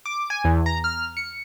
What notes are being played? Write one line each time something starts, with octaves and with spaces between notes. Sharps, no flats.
D6
G#5
E2
A#5
F6
C#7